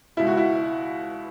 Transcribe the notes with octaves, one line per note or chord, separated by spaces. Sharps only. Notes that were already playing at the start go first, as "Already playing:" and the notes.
C#2 B2 E4
F#4
E4